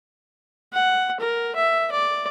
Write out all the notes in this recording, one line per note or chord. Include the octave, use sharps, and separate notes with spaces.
F#5
A#4
E5
D5